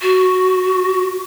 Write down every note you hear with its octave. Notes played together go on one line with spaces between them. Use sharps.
F#4